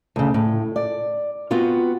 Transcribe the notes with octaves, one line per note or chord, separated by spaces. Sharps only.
D2 C#3
A2
D5
B3 C4 F4 F#4